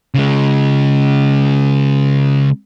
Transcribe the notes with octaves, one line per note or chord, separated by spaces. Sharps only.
C#3 G#3